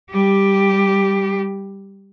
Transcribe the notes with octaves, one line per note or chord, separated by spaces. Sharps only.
G3 G4